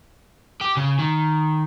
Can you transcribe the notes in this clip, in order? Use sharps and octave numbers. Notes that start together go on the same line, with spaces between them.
G4
C#3
D#3